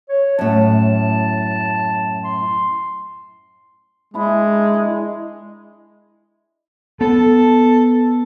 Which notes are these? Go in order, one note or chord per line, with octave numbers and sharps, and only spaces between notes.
C#5
F#2 A2 A5
C6
G#3 D4 E4 D6
A#4
D#5
B3 A4